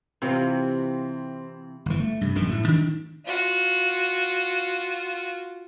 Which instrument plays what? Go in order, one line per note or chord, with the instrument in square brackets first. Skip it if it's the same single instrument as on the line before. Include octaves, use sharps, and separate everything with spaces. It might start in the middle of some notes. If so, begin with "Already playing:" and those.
[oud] C3 E3 F4 [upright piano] C4
[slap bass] G1 E3
A3
G2 C3
A#1 F#2 D3 D#3
A2 A3
D#3 D4
[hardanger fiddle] F4 F#4